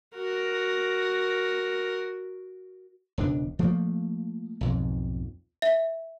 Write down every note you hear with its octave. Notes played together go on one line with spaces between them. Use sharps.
F#4 A#4
E1 C#2 D4
F3 A3 A#3
B1 F2 G#2
E5